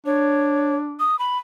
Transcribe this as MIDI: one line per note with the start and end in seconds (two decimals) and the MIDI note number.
0.06 1.06 62
0.06 0.76 73
1.00 1.19 87
1.19 1.38 83